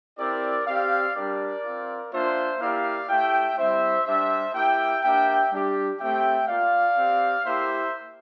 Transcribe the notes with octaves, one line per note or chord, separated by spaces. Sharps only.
C4 E4 G4 A#4 D5
C4 G4 D5 F5
G3 D4 G4 A#4 D5
C4 F4
A#3 D4 F4 C5 E5
A#3 E4 G4 D5 F5
A3 E4 G4 E5 G5
G3 C4 E4 C5 E5
G3 D4 G4 C5 E5
A#3 E4 G4 E5 G5
A#3 D4 G4 E5 G5
G3 D4 G4
A3 C4 G4 E5 G5
A#3 F4 D5 F5
C4 G4
A#3 E4 G4 C5 E5